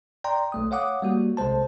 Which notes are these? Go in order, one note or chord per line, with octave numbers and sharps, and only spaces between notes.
D5 G5 A#5 C6
B1 A3 D#6
C#5 F5 F#5 D6 D#6
G3 A#3 F#4
B1 C3 G#3 C5 A5